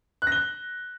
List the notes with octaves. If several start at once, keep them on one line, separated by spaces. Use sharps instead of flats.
F#6
A#6
G7